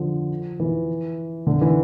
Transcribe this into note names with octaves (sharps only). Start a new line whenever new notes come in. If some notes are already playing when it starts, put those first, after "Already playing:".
Already playing: D3 F3
E3
D3
E3